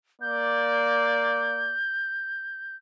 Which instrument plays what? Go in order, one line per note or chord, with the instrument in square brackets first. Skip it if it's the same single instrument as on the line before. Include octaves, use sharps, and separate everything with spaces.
[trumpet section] A#3 D5 [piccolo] G6